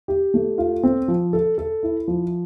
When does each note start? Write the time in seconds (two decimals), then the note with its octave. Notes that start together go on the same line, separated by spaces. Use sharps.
0.08 G4
0.34 A3
0.58 F4
0.83 C4
1.08 F3
1.33 A4
1.58 A4
1.83 E4
2.08 F3